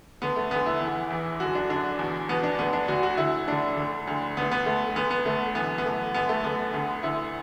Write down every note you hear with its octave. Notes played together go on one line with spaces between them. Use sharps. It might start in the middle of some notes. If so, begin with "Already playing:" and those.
D2 D3 B3
A3
D2 D3 B3
E4
E2 E3
E2 E3
F#2 D3 F#4
D4
F#2 D3 D4
E2 B2
E2 B2 B3
D4
D2 D3 B3
D4
D2 D3 F#4
F#4
D2 D3 E4
D2 D3 D4
D2 D3
D2 D3
D2 D3 B3
B3
D2 D3 A3
D2 D3 B3
B3
D2 D3 A3
F#2 E3 B3
B3
F#2 E3 A3
F#2 D3 B3
A3
F#2 D3 B3
D2 D3
D2 D3 E4